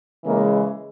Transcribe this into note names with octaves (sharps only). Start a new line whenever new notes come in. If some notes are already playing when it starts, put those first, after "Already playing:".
C#3 E3 G#3 A#3